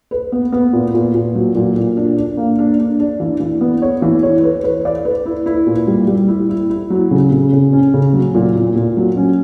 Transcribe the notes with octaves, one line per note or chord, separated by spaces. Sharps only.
B4
B3
B3
A#2
A#2
A#2
F#3
A#2
A#2
D4
D4
A#3
D4
D4
D4
E3
E3
B3
C#5
E3
C#5
B4
B4
D5
B4
E4
E4
A#2
G3
G3
E4
E4
E4
F#3
C#3
C#3
C#3
C#4
C#3
F#3
A#2
A#2
A#2
F#3
C#4